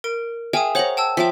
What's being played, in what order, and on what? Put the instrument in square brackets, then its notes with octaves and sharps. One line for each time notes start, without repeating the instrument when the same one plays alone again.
[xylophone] A#4 D7
[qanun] G#4 E5 F5 [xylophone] G5 G#5 D#6
[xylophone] C5 F#5 F#7 [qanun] C#5 A#5
[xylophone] G5 A5 E6
[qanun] F3 E5 D6 [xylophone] G5 B6